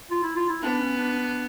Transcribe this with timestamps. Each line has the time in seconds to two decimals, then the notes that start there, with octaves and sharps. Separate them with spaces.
0.11 F4
0.23 E4
0.36 F4
0.49 E4
0.62 B3 D4
0.80 C#4
0.97 D4
1.14 D4